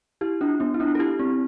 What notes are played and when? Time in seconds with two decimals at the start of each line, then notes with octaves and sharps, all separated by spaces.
0.21 E4 G4
0.41 D4 F4
0.60 B3 D4
0.74 E4
0.80 D4 F4
0.95 A4
0.99 E4 G4
1.19 C4 E4